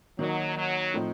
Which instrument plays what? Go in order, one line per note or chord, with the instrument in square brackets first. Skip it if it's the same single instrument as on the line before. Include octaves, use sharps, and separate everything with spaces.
[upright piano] D#3 A#3 D#4 [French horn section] F#3
[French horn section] F#3
[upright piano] A2 F3 C4 D#4